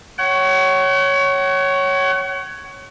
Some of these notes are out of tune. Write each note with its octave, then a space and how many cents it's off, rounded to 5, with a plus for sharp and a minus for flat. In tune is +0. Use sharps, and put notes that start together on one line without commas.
C#5 +0 F#5 +40